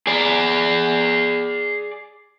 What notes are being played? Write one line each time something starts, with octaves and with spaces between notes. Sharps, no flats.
G#4 D5